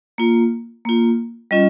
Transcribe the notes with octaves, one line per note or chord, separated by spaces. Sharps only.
A#3 F4
A#3 F4
G3 C#4 F4 D#5